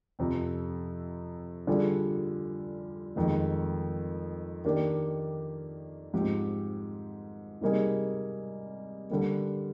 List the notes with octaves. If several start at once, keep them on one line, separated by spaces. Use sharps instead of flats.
F2 C3 F3 C4
D3 G3 D4 F4 G#4
F2 D#3 G#3
D#3 A#3 D4 G4
G#2 F3 C4 G4
C3 G3 A#3 D#4 G#4
D3 G3 A#3